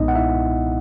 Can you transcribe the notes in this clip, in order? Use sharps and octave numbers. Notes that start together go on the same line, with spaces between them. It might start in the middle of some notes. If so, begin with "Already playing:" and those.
Already playing: B1 A#2 G#3 B3 D#4 D#5
F#5
E4 E5